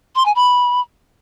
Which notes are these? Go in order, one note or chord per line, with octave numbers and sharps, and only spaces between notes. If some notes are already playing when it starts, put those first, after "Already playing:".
C6
G#5
B5